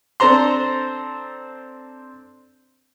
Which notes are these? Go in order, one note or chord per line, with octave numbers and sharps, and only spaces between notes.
C4 D4 A4 C5 A#5 C6